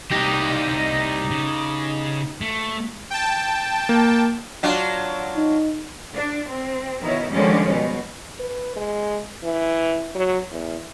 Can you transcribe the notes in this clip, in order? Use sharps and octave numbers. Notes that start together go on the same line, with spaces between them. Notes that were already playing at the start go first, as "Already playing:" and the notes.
C2 G3 D#4 G4
C#3
A3
G5 A5
A#3
F#3 D4 F4
D#4
D4
C4
B2 D#3 E4 C#5
D3 D#3 F3 G3 G#3 C#4
B2
B4
G#3
E3
F#3
E2